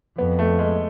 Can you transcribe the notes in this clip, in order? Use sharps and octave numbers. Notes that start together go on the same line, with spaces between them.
F2 B3
A3
G#3